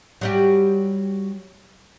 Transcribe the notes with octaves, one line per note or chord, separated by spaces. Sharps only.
F#3 G3 G4